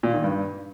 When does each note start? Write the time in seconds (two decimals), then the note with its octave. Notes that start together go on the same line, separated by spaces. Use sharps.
0.03 A#2
0.13 D#3
0.24 G2